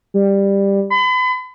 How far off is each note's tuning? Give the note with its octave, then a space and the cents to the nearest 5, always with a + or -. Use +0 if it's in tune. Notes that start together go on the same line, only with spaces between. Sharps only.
G3 +10
B5 +40